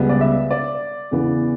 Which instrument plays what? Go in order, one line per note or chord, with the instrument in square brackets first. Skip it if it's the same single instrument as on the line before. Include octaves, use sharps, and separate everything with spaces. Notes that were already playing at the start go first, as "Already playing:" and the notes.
Already playing: [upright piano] C#2 C#3 G3 B3
D5
E5
D5
E2 C#3 E3 B3